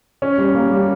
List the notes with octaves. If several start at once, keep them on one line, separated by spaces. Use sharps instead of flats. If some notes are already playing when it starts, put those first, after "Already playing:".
C#4
G3
A#3
G3